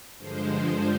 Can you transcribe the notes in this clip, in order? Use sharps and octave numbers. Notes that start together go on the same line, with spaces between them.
G2 D3 F3 G#3 C5